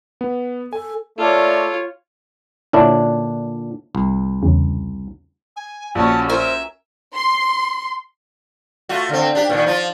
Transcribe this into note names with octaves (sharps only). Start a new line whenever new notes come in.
B3
A4 G#5
A3 F4 A4 A#4 C#5 D5
A#2 D3 C#4 D4 E4
C2
E2 C#3
G#5
A#1 C#4 F#4 A5
A#4 C5 E5 G#5
C6
A3 F4 F#4
D3 C4
D4 G4
A#2 D3 D#3
F3 F4